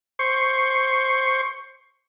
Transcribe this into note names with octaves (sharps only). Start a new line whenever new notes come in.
C5 C#6